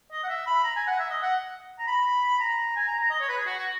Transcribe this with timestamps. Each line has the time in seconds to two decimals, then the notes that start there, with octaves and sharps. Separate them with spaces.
0.12 D#5
0.24 F#5
0.28 E5
0.46 B5
0.64 A#5
0.76 G#5
0.87 F#5
0.99 E5
1.10 D#5
1.22 F#5
1.79 A#5
1.87 B5
2.40 A#5
2.76 G#5
2.87 A#5
2.99 A#5
3.10 D#5
3.20 C#5
3.28 B4
3.38 G#4
3.46 F#4
3.57 F#4